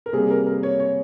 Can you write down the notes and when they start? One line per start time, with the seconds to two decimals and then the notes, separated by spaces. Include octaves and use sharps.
0.06 A#4
0.13 C3 G3 A#3 G#4
0.30 A#4
0.46 A#4
0.63 C#5
0.80 C#5